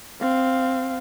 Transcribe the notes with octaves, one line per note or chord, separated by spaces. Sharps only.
C4 F5